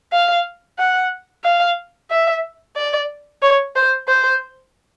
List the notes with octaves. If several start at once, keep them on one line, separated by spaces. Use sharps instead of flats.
F5
F#5
F5
E5
D5
C#5
C5
C5